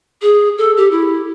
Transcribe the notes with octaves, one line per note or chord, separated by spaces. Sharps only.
G#4
A4
G4
E4